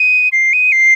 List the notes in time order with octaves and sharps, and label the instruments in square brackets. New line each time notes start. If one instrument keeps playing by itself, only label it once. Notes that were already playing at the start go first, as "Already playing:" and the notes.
Already playing: [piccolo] D#7
C7
D#7
C7